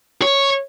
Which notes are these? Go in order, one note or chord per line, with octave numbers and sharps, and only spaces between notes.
C#5